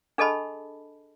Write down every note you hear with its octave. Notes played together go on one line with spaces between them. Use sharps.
D4 G#4 A4 D#5 A5 B5